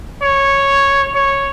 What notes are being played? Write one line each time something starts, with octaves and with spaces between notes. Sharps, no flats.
C#5
C#5